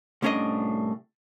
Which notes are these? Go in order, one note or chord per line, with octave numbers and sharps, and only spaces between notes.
C2 A2 C#4 D4 D#5